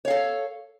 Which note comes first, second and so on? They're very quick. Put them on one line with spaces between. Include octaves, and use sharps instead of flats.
C#5 F5 A4